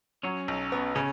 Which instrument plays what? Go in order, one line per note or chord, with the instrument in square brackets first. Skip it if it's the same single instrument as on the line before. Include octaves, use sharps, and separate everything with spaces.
[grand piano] F#3 [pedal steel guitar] C#4 C#5
[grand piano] B1
B3
[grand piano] C#3 [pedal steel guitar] C#4 C#5